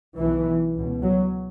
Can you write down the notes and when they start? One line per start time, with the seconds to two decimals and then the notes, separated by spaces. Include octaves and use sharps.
0.17 B1 B2 E3
0.74 C#2 B2
1.02 F#3